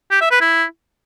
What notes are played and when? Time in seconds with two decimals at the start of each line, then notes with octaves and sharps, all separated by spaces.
0.11 G4
0.21 E5
0.31 B4
0.41 E4